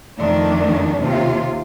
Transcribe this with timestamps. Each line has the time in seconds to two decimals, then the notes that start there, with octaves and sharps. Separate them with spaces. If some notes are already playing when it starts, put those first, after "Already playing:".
0.18 F2 D#3 A3 D4
0.99 D#2 C3 F4